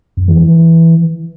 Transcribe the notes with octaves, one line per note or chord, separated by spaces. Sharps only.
F2
E3
E3